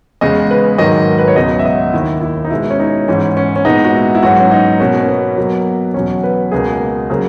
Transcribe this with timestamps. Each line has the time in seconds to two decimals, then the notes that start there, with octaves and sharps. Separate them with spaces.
0.21 E2 C#3 G#3 D#5
0.51 B4
0.78 G#2 D#3 F#3 A#3 D#5
1.10 A#4
1.18 B4
1.28 C#5
1.36 C#2 B2 F#3 B3 D#5
1.59 E5
1.65 D#5
1.93 D#2 D#3 A#3 E4
2.21 E4
2.45 D#4
2.50 B2 G#3 B3 E4
2.70 C#4
2.79 D#4
3.08 G#2 E3 B3 C#4
3.37 C#4
3.56 C#4
3.65 A#2 G#3 B3 D#4
3.84 F#4
3.95 E4
4.15 E4
4.22 G#2 F#3 B3 F#4
4.40 C#4
4.52 D#4
4.80 B2 A#3 C#4
5.00 C#4
5.08 B3
5.38 B2 F#3 A#3
5.94 E2 B2 F#3 C#4
6.23 B4
6.51 C#2 B2 A#3 G#4
7.10 C#3 F#3 A#3